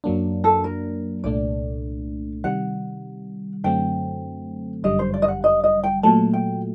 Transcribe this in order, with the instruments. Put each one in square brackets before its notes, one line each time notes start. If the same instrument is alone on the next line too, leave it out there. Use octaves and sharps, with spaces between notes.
[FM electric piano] F#2 F#3 A#3 D4
[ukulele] A4
A#4
[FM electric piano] C2 A#2 A3 D4 [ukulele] D5
[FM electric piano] C3 D#3 G3 [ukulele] F#5
[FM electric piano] F#2 D3 F#3 A3 C4 [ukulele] G5
[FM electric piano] G1 F#2 D3 G3 [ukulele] D#5
[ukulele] C5
D5
D#5
F#5
D#5
D#5
G5
[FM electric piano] A#2 F#3 A3 [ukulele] A5
[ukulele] G5